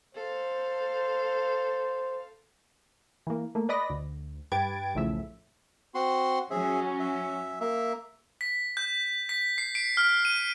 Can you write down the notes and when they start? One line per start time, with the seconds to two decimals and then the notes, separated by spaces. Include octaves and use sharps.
0.15 A4 C5 F5
3.27 E3 A#3
3.55 A3 A#3
3.69 B4 D5 D#5 B5 A#6
3.90 D2
4.52 G2 G4 B4 G#6 A6 D7
4.95 B1 E2 A2 C#3 F3 E5
5.95 C4 F#4 C6
6.50 F#3 C#4 G#4 E5
7.00 E5
7.61 A#3 E5
8.41 B6
8.77 G6
9.29 B6
9.58 C7
9.75 D7
9.97 F6
10.25 D#7